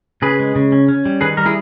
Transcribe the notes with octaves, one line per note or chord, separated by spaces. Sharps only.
C#3 G#4 B4
G#3
C#3
C#4
C#4
G3
D#3 G#4 B4
G3 A#4
E4 G#4